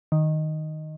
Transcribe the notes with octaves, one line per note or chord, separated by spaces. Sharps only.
D#3